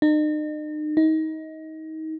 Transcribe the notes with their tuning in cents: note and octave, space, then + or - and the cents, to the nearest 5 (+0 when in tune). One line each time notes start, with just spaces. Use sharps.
D#4 -40
D#4 +25